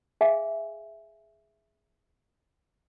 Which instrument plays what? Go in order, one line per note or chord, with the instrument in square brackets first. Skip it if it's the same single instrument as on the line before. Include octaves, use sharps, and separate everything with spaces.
[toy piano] G#4 E5 F5 G#5